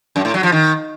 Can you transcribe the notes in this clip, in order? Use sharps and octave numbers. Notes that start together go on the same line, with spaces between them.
F#2
A2
F#3
F3
D#3